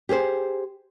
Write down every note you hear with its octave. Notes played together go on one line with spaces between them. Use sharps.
G4 G#4 B4 C5